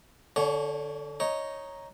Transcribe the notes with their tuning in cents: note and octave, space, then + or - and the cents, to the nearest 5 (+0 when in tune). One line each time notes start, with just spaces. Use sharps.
D3 +0 C#4 +45 C#5 +0
D#4 +0 C#5 +0